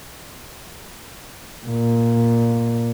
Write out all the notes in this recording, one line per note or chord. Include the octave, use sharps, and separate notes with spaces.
A#2